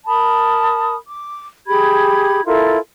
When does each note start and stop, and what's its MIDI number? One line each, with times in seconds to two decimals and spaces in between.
0.07 0.95 70
0.07 0.95 81
0.07 0.95 83
0.07 0.95 87
1.06 1.45 86
1.67 2.44 67
1.67 2.44 68
1.67 2.44 83
1.67 2.44 92
2.45 2.77 64
2.45 2.77 65
2.45 2.77 69
2.45 2.77 70